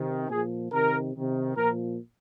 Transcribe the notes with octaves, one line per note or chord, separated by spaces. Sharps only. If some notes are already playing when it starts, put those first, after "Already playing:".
Already playing: C3 D#3
A#2 F3 G#4
C3 D#3 A#4
C3 D#3
A#2 F3 A#4